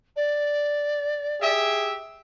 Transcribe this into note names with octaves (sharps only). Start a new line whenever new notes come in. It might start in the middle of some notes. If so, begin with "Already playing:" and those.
D5
G4 G#4 E5